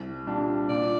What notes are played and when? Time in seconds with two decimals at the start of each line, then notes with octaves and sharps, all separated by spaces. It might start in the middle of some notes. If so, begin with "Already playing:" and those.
Already playing: C2
0.27 A#2 G3 D4
0.69 A#2 D5